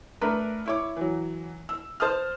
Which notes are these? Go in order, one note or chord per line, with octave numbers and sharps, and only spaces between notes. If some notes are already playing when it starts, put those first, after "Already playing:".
A3 D4 A#4 B4
E4 C#5 D6
E3 F#3
E6
C5 A5 D#6 F6